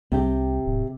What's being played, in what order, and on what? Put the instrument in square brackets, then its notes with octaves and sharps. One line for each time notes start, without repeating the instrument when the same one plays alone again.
[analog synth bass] C2 [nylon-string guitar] C3 G4
[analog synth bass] D1